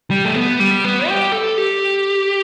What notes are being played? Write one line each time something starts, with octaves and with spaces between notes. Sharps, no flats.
G3
A3
B3
G3
B3
G4
A4
G4